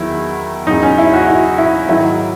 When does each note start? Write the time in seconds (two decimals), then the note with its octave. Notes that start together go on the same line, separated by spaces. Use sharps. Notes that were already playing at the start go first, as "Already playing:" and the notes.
Already playing: E2 D#3 F#3 E4
0.67 E2 C#3 F#3 D#4
0.83 C#4
0.98 E4
1.13 F#4
1.28 E4
1.58 E4
1.88 G#2 D#3 F#3 E4